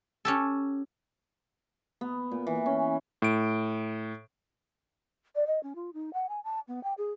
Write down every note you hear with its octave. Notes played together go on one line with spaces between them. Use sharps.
C#4 G4 A4
B3
A#2
E3
C#4
A2 D7
D5
D#5
C#4
F4
D#4
F#5
G#5
A5
B3
G5
G#4